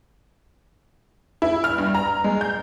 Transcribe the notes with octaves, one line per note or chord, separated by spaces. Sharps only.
E4
F6
G2
A#5
G#3
G6